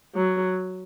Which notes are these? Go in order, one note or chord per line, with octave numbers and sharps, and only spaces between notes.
F#3